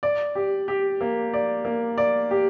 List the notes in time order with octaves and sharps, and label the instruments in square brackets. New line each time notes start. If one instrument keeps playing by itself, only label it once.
[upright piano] D5
G4
G4
A#3
D5
A#3
D5
G4